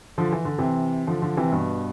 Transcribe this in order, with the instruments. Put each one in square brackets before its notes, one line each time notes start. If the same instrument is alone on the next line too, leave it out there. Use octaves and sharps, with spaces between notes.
[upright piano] D3 F3
E3
D3
C3 E3
D3 F3
D3 F3
C3 E3
G2 B2